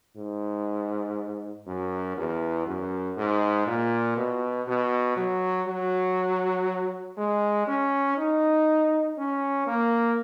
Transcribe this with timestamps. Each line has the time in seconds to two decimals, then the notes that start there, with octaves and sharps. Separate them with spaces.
0.16 G#2
1.67 F#2
2.17 E2
2.66 F#2
3.17 G#2
3.67 A#2
4.17 B2
4.67 B2
5.17 F#3
5.67 F#3
7.18 G#3
7.68 C#4
8.17 D#4
9.18 C#4
9.67 A#3